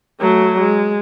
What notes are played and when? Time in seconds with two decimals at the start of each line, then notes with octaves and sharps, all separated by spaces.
0.21 F#3 A3
0.60 G#3